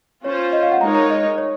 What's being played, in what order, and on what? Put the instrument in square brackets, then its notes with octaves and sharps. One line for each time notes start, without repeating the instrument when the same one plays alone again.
[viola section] C#4 F4 C5 [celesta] C#5
[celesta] D#5
F5
F#5
[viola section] G#3 D#4 A#4 C#5 [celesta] A#5
[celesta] A#5
D#5
C#5